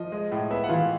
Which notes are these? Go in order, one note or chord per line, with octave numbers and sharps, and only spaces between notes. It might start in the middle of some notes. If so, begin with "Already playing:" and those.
Already playing: F3 D#5
G#3
A2
B3 E5
F#5
E3 F4 F5